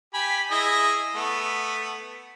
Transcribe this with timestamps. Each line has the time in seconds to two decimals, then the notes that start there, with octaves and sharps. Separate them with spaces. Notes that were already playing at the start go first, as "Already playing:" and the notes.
0.14 G4 G#5 B5
0.51 E4 G#4 D#5
1.15 A3 B3